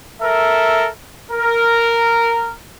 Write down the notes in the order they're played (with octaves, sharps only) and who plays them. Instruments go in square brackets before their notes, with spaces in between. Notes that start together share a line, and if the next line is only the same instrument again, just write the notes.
[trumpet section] A4 A#4 E5
A#4